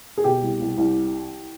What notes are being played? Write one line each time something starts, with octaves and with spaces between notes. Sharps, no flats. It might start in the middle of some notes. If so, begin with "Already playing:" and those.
G#4
B2 G4
C2
C2
C2